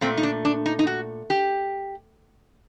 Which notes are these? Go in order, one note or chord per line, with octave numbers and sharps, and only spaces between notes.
A#2 A3 C4
D#4
D4
D4
D#4
D#4
F#4
G4